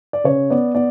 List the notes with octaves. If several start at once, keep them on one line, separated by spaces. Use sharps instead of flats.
D5
C#3 C#5
B3 D5
B3 D5